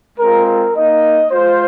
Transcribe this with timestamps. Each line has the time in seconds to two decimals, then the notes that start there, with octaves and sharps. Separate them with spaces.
0.19 G#3 C4 F4 A#4
0.47 A#4
0.75 A#3 D#4 D#5
1.31 G#3 F4 C5